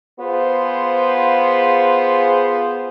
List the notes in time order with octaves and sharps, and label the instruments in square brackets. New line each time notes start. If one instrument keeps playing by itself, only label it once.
[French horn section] B3 F4 G#4 C5